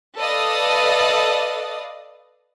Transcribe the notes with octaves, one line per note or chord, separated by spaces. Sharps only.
A4 B4 D5 D#5 F5 D#6